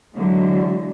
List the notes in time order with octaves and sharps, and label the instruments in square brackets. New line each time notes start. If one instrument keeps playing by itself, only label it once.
[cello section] D3 E3 F#3 G#3